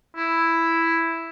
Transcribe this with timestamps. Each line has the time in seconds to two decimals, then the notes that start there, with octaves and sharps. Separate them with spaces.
0.16 E4